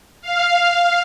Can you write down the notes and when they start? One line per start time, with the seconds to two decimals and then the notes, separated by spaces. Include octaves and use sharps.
0.21 F5